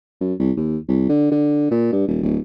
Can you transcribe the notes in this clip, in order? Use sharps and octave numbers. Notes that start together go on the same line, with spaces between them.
F#2
C2
D#2
C2
D3
D3
A#2
G2
D#1
D1